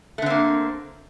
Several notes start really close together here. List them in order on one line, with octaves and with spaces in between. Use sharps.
A3 D3 C4 A#3